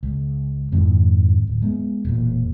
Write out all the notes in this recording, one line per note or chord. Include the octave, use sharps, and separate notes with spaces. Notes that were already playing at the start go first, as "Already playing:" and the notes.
C#2
F2 G#2 D#3 C4
D1
G#3 B3
E1 A#2